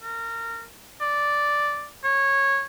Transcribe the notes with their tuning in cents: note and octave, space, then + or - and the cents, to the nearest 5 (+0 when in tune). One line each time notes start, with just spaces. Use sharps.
A#4 -25
D5 -5
C#5 -15